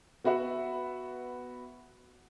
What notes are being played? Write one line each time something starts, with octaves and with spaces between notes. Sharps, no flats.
B3 F#4 B4 E5 F#5